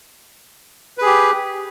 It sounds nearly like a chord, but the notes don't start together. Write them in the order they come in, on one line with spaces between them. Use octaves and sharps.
B4 G#4 G4